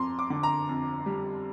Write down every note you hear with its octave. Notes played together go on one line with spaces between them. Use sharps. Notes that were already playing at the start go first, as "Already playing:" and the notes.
Already playing: F2 A#5 C6 D6
D6
D3
A#5
F2
G3